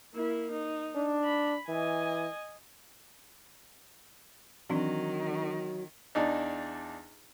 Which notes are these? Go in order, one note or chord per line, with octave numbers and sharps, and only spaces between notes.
A#3 E4
D#4
D4
B5
E3 D#5 G#5
D#3 E3 F#3 C4 D4
E2 D4 D#4